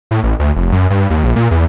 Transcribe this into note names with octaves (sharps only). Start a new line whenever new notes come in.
A2
A1
D2
F1
F#2
G2
D#2
A#1
A#2
E2